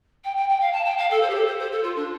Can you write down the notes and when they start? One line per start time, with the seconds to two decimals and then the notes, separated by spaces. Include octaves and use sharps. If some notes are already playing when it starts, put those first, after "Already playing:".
0.24 G5
0.36 G5
0.49 G5
0.61 F5
0.73 A5
0.85 G5
0.98 F5
1.10 A4
1.22 C5
1.30 G4
1.35 A4
1.47 C5
1.59 C5
1.72 A4
1.83 F4
1.96 D4